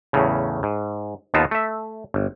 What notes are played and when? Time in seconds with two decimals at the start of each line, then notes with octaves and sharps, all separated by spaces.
0.13 E2 A2 C#3
0.63 G#2
1.34 D#2 B3 D#4 F4 A5
1.51 A3 E5
2.14 G1